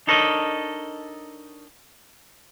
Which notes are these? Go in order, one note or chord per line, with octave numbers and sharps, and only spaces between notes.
D4 D#4 A4 A#4 C#5 D#5